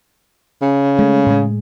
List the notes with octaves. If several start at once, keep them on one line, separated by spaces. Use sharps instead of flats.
C#3
G#3 A3
A2 G#3